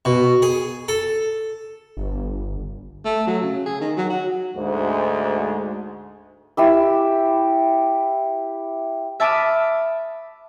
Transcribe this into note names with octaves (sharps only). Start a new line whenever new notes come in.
B2
G#4
A4
G1
A3
F#3
C#3
G#4
D#3
F#3
F#4
D2 G#2 G#3
E4 G4 E6
E5 A5 B5 D6 D#6 F6